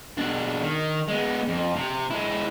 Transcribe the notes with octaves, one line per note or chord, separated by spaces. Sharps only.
B2 D4
D#3
G#3 B3
F2
C3
G#3 E4